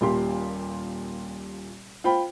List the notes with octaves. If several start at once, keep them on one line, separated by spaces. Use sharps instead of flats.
D#1 A#2 G4 C6
F4 C5 G5 B5